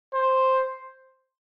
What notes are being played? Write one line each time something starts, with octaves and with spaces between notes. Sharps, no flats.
C5